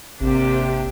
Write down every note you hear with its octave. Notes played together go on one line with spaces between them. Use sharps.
G#1 C3 A#3 D4 G4